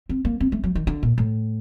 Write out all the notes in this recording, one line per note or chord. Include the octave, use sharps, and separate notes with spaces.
C4
A#3
C4
A3
F#3
D#3
D3
A#2
A2